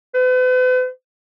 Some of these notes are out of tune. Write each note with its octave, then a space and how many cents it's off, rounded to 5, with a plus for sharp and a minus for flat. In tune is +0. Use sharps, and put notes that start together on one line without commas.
B4 +45